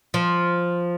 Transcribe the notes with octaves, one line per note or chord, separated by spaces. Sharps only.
F3